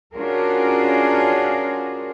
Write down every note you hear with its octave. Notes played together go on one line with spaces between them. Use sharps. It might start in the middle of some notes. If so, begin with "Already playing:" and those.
C#4 D4 F4 F#4 G#4 A#4